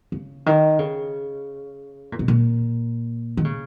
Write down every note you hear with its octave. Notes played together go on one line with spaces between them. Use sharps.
C#3
D#3
C#3
A#2
B2
A#2
D#3
C#3